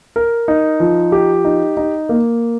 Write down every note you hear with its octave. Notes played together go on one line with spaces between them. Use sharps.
A#4
D#4
F3
G4
D#4
D#4
A#3